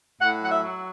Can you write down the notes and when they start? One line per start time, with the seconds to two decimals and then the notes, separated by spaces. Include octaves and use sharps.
0.21 A2 F#5
0.42 F#3 F#5
0.51 E5
0.62 F#3